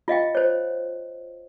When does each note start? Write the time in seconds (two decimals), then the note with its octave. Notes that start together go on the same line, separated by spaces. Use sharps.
0.08 F4 D#5 F5 G5
0.35 C5 C#5